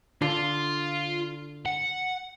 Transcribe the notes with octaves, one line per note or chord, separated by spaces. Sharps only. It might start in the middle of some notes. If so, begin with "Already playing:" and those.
D3 F4
F#5